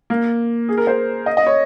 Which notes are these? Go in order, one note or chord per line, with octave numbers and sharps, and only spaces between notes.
A#3
G#4
A#4
C5
D#5
D#5
C#5